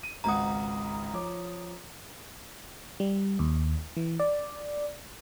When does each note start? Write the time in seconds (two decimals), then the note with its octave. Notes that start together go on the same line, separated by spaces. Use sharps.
0.03 D#7
0.24 G#1 C#2 F#5 A#5 D#6
1.13 F3 C#5 D6
3.00 G3
3.39 D#2
3.97 E3
4.20 D5